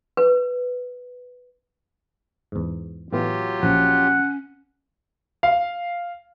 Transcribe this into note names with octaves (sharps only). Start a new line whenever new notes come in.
B4
E2 G#2
A2 E3 F#3 B3 F4 G4
A#1 F3 C#4 F#5
F5